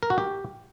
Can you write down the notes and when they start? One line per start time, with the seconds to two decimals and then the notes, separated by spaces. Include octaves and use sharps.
0.03 A#4
0.10 F#4
0.18 G4